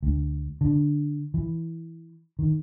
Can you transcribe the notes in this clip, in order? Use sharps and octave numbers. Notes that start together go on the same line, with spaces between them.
D2
D3
E3
D#3